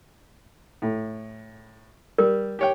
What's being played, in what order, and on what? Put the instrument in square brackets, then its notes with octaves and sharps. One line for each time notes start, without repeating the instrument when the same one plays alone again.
[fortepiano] A2
[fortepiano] G3 [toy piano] A#4
[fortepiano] G4 C#5 G5